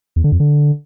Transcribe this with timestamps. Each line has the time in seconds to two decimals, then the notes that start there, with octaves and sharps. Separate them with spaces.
0.16 E2
0.24 D3
0.32 F2
0.40 D3